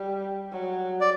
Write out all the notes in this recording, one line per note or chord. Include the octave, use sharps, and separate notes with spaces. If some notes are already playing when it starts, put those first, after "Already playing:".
Already playing: G3
F#3
D5